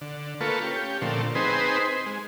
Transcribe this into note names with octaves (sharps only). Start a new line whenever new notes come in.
D3
A3 A#3 F4 A4 B4 C#6
C#4 G4
A#2 D3 F3 A3 C4
C4 D#4 G#4 B4 C5
G#3